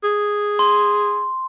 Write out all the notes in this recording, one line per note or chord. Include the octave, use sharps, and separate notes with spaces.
G#4
C6